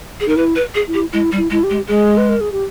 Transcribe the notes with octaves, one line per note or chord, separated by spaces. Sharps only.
G#4
D#4 A#4
E4 B4
B4
G#4
E4
G4
G#3 E4
G3
E4
G#3 E4
G4
G#3
G#3 G#4
B4
A#4
G#4
G4